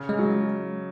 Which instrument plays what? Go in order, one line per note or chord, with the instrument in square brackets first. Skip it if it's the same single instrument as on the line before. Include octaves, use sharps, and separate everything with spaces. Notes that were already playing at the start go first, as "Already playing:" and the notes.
Already playing: [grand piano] C#3
[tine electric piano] G#3
[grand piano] F#3